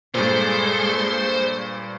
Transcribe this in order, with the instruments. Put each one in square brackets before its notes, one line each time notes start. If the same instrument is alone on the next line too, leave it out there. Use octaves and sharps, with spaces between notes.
[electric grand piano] G2 A#2 [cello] G#3 A4 [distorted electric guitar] C5